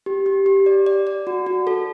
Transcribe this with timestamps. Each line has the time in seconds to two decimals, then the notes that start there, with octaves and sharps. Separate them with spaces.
0.06 G4
0.26 G4
0.46 G4
0.66 D5
0.86 D5
1.07 D5
1.27 F#4
1.46 F#4
1.67 A4